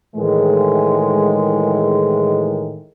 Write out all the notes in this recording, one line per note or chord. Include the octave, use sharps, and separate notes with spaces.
A2 D#3 E3 G#3